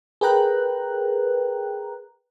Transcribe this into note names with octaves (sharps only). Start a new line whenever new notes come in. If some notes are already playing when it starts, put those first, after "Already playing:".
G#4 A#4 B4 G5 A#5 F#6